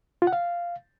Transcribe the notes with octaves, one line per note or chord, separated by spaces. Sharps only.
F4
F#5
F5